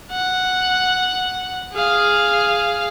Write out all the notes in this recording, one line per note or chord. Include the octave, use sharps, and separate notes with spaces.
F#5
G#4 F5